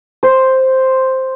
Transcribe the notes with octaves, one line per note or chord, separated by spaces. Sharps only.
C5